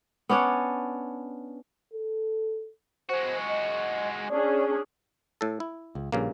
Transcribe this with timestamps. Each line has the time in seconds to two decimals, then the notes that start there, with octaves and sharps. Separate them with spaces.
0.29 B3 C#4 D4 C#5
1.94 A4
3.09 G#3 F#4 C5
3.49 D#5
4.29 C#4 D4 G#4 D5
5.41 A2 A4
5.60 E4
5.95 C#2
6.12 A#1 G2 C#3 A#3